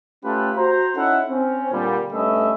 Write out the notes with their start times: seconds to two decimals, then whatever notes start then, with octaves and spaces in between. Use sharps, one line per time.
0.24 A3 C#4 F4 G4 A4 B4
0.57 F#4 C5 A#5
0.95 C#4 D#4 E4 A4 E5 F#5
1.29 C4 C#4
1.72 A#2 D3 G3
2.12 G2 A3 C#4 B4 D#5 E5